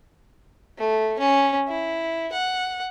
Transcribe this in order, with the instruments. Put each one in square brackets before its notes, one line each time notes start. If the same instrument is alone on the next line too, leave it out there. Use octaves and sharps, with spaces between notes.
[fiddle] A3
C#4
E4
F#5